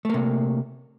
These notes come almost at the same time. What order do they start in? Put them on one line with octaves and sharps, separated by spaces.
A3 A#3 C3